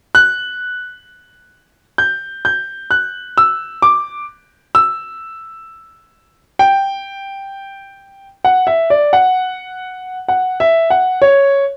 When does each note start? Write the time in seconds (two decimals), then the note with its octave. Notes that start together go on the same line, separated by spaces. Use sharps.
0.15 F#6
1.98 G6
2.45 G6
2.91 F#6
3.38 E6
3.82 D6
4.75 E6
6.59 G5
8.45 F#5
8.67 E5
8.90 D5
9.13 F#5
10.28 F#5
10.60 E5
10.90 F#5
11.22 C#5